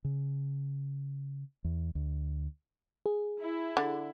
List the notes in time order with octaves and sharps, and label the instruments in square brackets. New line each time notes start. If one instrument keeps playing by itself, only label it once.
[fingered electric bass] C#3
E2
D2
[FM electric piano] G#4
[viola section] E4
[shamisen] D3